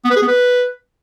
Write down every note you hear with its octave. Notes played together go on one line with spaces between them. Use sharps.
B3
B4
G#4
B3
B4